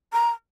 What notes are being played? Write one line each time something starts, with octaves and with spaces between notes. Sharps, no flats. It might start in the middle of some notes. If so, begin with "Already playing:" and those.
A#5